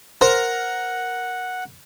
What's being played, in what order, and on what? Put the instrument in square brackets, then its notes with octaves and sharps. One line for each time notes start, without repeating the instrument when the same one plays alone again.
[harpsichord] A#4 [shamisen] C5 [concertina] F#5